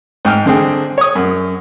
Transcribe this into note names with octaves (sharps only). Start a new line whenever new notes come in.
G#2 G5 F6
D3 C4 G#4 G5
C#5 D#6
F#2